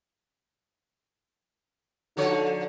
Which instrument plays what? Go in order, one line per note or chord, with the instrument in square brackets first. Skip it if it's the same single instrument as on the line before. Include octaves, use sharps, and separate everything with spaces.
[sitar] D3 F3 C#5 [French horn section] D#4 F#4 A4